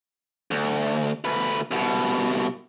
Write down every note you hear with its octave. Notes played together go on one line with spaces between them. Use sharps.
D2
D2 B4
C2 B2